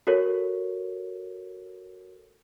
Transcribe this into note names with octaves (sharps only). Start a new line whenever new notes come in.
F#4 A4 A#4 C#5